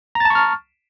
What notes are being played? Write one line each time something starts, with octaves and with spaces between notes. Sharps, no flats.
A5 A#5 C#6 F6 A6